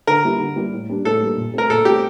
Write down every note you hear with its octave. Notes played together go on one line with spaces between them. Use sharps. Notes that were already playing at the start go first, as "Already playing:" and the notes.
D3 A#4
G3 A#3 E4 G4
D3
G3 A#3 E4 G4
A2
G3 A#3 D4
A2 A4
G3 A#3 D4
A#2
A3 C4 A#4
A#2 A4
A3 C4 G4